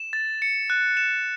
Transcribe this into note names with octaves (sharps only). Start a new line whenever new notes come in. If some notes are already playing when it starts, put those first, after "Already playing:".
Already playing: E7
A6
C#7
F#6
E7